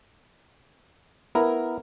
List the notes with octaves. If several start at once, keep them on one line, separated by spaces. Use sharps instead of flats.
B3 E4 A#4